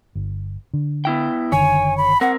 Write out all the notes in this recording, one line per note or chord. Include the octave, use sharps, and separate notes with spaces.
G1
D3
B3 E4 G5
F#1 D3 D#3 C#5 G#5
B5
C4 A#4 F#5